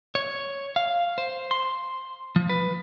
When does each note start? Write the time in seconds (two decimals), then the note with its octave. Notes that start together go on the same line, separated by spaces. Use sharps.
0.15 C#5
0.76 F5
1.18 C5
1.51 C6
2.36 F3
2.49 B4